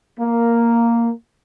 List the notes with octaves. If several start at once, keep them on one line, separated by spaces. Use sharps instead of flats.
A#3